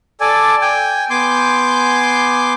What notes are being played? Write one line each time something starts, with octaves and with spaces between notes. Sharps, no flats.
A4 D5 G#5
G5 G#5
B3 G#5 C6 D6 G6